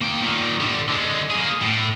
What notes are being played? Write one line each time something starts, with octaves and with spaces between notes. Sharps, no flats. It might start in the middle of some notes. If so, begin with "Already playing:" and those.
A#3 G5
A#2 D#3
D3 G3
D3 G#3
A#3 G#4
A2